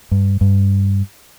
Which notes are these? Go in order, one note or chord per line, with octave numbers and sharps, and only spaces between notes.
G2
G2